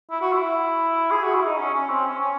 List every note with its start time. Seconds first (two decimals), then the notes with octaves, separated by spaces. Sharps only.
0.11 E4
0.22 F#4
0.33 E4
1.11 G#4
1.24 F#4
1.35 E4
1.46 D#4
1.58 C#4
1.74 C#4
1.89 C4
2.06 C#4
2.21 C#4